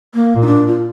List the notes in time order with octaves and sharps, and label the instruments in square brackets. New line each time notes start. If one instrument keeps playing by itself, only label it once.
[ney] A#3
[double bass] A#2
[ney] D#4
D4
F4